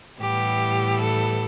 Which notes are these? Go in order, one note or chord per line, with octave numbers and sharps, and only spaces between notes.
A2 E3 G3 B3 G4
A4